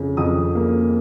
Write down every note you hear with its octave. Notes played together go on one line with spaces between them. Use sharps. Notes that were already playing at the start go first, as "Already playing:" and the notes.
Already playing: F2 C#3
F2 D#6
A#3